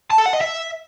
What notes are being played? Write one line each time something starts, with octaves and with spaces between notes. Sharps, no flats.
A5
A4
F#5
D#5
E5